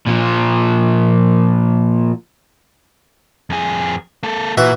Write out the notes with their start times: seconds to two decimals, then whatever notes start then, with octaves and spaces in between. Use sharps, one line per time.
0.07 A#2 F3
3.50 F2 G#4
4.23 A#3 A4
4.57 A#2 E3 F#4 E5